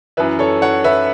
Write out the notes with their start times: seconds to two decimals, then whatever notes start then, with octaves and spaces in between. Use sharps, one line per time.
0.17 F#2 E3 B4 E5
0.39 A4 C#5
0.62 C#5 F#5
0.84 B4 E5